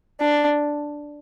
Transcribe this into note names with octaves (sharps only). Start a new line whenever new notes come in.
D4